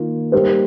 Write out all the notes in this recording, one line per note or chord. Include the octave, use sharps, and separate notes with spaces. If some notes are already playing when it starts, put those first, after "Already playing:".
Already playing: D#3 A#3 F4
G3 A#3 D#4 G4 C5